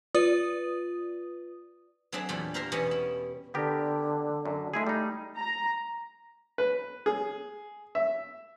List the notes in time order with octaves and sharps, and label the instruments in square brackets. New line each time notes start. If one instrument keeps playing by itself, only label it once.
[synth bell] F4 B4 D5 D#6
[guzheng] F#3 C4 D4 G#4 A4 E5
E2 A#2 G3 D5 B5
A#3 A#4 C5 E5 A#5
E2 B2 G3 B3 C#4 D#5
E4
[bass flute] D3 [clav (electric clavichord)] B3 G4 A#4
[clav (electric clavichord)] F#2
[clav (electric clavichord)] G#3 E4 G#4 [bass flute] A3
[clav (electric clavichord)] G3 D#4
[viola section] A#5
[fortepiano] B4
G#4
E5